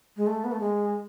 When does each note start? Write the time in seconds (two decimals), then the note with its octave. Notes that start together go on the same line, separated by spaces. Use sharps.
0.17 G#3
0.27 A3
0.44 B3
0.52 A3
0.60 G#3